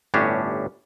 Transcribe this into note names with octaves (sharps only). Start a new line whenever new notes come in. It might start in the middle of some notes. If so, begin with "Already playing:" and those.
G1 A2 C#4 D4 G4 C#5